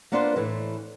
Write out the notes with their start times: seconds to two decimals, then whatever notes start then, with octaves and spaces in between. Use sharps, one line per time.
0.12 A#3 B3 D4 F4 B4 C5
0.36 A2 E3 A3